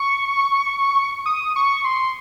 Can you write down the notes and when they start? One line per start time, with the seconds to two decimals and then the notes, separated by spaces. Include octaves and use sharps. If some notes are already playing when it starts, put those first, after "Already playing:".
Already playing: C#6
1.26 D#6
1.56 C#6
1.85 C6